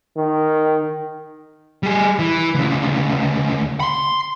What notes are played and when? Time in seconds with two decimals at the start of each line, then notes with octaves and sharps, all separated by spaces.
0.17 D#3
1.83 G3 G#4
2.19 E3
2.55 D2 C#3
3.80 B5 C6